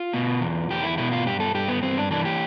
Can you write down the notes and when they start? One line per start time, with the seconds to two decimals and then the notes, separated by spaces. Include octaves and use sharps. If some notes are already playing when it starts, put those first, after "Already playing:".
Already playing: F4
0.14 B2
0.41 E2
0.70 E2 G4
0.84 E4
0.98 B2 E4
1.12 F4
1.26 G2 G4
1.40 A4
1.55 G2 G4
1.68 B3
1.83 G2 C4
1.98 D4
2.11 E3 D4
2.25 G4